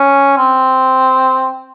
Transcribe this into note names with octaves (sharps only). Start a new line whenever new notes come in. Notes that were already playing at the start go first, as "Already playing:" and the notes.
Already playing: C#4
C4